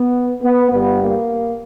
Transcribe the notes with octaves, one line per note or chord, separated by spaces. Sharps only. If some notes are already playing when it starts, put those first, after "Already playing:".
Already playing: B3
B3
G1 G2 G3 B3
A#3